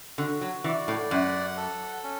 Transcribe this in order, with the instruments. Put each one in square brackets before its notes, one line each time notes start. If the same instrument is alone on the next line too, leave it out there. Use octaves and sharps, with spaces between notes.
[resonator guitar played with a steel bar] D3 [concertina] F#4
[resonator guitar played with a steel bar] F#3
[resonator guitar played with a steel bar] E3 [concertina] D5
[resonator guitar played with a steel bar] A2
[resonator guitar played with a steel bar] F#2 [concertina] F#5
[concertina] A4
C#4